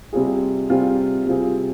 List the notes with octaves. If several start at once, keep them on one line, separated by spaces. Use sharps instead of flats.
C3 G3 C4 F4 G#4
C3 G3 C4 F4 G#4
C3 G3 C4 F4 G#4